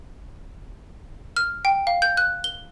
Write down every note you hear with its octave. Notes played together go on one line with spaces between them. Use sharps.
F6
G5
F5
G6
F#6
G7